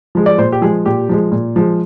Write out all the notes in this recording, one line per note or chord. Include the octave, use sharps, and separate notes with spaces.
F3 G#3
D5
A#2 C5
G4
F3 G#3 G#4
A#2 G4
F3 G#3
A#2
F3 G#3